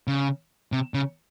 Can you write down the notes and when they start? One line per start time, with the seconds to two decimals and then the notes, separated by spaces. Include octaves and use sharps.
0.08 C#3
0.72 C3
0.94 C#3